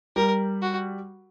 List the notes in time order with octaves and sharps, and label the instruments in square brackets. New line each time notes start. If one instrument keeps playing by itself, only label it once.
[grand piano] G3 [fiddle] A#4
[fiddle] F#4